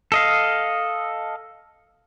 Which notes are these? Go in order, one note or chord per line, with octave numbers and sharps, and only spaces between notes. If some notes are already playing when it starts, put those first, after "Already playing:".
A4 D#5 F5